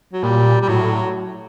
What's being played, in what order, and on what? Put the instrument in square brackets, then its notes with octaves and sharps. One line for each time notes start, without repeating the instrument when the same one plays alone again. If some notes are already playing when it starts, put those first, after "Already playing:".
[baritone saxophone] F#3
[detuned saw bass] A#2 [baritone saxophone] G3
[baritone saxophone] G3
[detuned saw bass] A2 [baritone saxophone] F#3